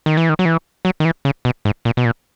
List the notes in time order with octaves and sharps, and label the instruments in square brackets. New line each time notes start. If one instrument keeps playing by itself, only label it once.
[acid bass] D#3
E3
D#3
F#3
E3
F#3
D#3
E3
C#3
B2
G#2
A#2
B2
A#2